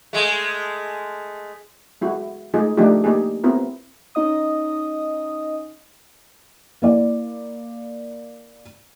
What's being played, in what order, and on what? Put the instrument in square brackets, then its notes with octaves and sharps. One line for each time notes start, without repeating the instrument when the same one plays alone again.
[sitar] G#3 A3
[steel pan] G#3 E4 F#4
G#3 A3 D#4 F4 G#4
F3 A3 D4 D#4 F4 G4
A#3 D#4 G4 G#4
B3 C4 E4 F4 A#4
[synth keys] C#4 D#4 D#5 D#6
[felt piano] A#3 E4 D5